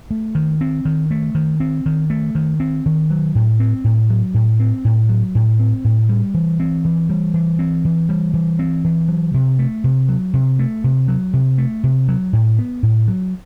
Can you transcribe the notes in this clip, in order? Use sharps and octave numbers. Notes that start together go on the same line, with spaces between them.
A3
D#3
C4
D#3
A3
D#3
C4
D#3
A3
D#3
C4
D#3
F#3
A2
C4
A2
F#3
A2
C4
A2
F#3
A2
C4
A2
G3
E3
C4
E3
G3
E3
C4
E3
G3
E3
C4
E3
F#3
C3
A3
C3
F#3
C3
A3
C3
F#3
C3
A3
C3
F#3
A2
B3
A2
F#3